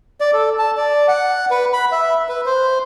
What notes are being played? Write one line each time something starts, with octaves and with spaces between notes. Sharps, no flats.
D5
A4
A5
D5
F#5
B4
B5
E5
B4
C5